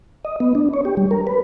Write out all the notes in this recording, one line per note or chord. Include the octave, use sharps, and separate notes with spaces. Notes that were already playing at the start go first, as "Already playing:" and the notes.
D#5
B3
D4
C#5
G4
G3
A#4
B4